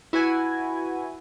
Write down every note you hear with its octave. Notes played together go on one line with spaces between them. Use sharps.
E4 F#4 B4 G#5